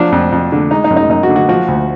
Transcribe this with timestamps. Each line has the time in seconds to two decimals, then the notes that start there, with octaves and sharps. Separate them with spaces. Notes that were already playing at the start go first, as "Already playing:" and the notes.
Already playing: F3 F#3 D4
0.12 F2
0.32 F2
0.52 D3
0.71 G#3 D#4
0.84 D#4
0.90 F#2
0.96 D#4
1.09 F#2 D#4
1.23 F#4
1.29 D3
1.36 F#4
1.49 F3 F#4
1.68 D2